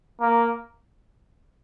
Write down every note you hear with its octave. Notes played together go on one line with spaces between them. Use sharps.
A#3